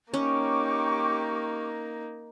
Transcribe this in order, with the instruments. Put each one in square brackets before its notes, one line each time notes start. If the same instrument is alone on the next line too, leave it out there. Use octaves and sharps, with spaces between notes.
[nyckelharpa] A#3 D#4 [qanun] C#4 [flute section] G4 C#6 D6